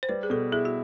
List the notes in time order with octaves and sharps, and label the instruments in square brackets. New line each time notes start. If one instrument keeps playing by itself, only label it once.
[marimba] C5
[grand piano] G3 [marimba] B4
[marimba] G#4
[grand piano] B2 [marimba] A4
[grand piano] E4 [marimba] G#4
[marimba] F#4